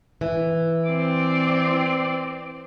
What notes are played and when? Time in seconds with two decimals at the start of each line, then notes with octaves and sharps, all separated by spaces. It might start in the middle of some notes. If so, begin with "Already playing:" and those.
0.21 E3
0.88 C4 D5